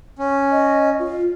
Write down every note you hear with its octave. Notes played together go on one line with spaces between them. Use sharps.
C#4
D#5
F4